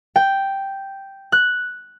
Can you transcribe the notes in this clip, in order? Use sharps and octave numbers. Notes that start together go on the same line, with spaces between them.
G5
F#6